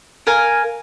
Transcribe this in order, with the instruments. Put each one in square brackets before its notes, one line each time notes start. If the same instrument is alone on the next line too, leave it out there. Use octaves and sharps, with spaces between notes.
[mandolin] A#4 F5 G#5